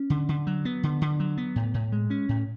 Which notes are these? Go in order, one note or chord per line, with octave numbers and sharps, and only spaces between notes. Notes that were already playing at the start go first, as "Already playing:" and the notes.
Already playing: C#4
D3
D3
F#3
B3
D3
D3
F#3
B3
A2
A2
G#3
C#4
A2